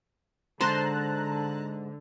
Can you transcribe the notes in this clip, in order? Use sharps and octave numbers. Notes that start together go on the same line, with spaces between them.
G#2 D3 C5 A5 A#5 C6 F#6